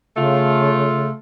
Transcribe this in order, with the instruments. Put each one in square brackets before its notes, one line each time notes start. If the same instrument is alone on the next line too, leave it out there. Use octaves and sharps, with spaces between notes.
[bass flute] C#3 [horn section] A3 F4